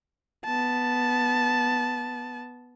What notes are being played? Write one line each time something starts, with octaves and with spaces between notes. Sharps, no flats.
B3 A5